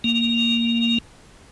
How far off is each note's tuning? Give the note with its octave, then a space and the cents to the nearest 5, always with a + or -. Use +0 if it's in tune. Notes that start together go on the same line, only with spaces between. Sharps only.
A#3 +0